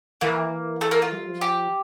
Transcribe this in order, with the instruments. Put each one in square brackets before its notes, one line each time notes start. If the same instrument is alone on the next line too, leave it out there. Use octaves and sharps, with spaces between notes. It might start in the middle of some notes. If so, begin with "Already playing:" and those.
[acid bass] E3 [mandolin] A#3
[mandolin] A3
A#3
F4
[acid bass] G3
F3
[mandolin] G4